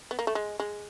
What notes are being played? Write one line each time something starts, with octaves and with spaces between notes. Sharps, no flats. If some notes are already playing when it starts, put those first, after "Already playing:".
B3
A#3
A3
G#3
G#3